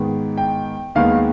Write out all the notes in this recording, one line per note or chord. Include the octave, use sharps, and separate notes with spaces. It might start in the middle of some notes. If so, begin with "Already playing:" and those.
Already playing: G#2 D#3 B3
G5
D#2 D#3 G#3 B3 F5